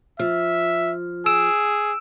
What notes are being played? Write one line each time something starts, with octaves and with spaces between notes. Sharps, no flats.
F3 E5 F6
G#4 E6 D7 E7